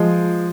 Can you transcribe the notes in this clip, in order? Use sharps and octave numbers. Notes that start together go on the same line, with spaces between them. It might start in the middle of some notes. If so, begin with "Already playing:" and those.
Already playing: F3 G#3